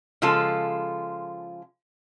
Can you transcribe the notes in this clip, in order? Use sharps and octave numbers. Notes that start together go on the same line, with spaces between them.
C#3 F3 G#3 F4 A4